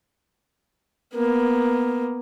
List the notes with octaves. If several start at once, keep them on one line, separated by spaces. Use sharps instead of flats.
A#3 B3